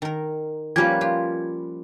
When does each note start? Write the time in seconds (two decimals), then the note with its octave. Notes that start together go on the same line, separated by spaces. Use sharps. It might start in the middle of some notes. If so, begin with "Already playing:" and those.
0.02 D#3 A#4
0.76 F3 G3 A#3 C#4 G4 B4 G#6
1.01 F4 G4